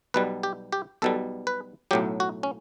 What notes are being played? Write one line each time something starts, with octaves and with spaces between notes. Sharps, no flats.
B1 B2 G3 B4
G4
G4
B1 B2 G3 A4
B4
B1 A2 F#3 G4
F#4
C#4